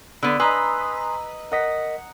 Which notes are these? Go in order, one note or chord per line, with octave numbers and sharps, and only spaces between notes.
D3 B3 E6
B4 D#5 G#5 A#5 C6 D#6 E6
A#4 D#5 F#5 B6